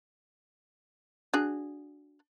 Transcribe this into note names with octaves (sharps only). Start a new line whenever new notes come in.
D4 F#4 G#4